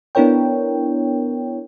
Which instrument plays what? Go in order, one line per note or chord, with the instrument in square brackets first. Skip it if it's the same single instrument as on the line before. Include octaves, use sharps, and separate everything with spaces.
[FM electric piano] B3 D4 E4 A#4 C#5 G5